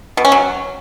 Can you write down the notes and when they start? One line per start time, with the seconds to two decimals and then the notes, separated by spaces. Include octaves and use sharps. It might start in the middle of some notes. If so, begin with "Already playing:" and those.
0.17 B2
0.25 C#4
0.32 F#3